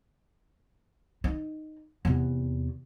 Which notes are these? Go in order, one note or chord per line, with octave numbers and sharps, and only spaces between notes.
D#4
E2 C3